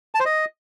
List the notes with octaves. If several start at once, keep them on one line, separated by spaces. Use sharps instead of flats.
A5
C5
D#5